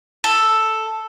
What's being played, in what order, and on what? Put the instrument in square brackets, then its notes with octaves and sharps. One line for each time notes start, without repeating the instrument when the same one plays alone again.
[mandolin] A4